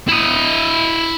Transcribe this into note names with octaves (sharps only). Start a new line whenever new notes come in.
E4 D#5